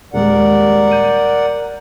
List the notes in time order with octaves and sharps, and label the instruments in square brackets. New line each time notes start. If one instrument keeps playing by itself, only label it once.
[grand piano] D#1 G#3 G4 [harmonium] A#4 D5 F#5
[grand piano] G6 D#7